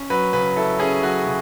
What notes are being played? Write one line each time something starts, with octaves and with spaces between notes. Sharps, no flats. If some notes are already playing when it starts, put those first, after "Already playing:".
Already playing: C#4
F#3 B4
C#3 B4
E4 A4
C#4 G#4
F#3 F#4
C#3